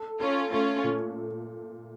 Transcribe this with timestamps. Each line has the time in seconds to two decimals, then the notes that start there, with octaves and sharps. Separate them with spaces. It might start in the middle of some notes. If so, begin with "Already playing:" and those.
Already playing: A4
0.20 C#4 F4 A4
0.52 A3 C#4 F4
0.84 A#2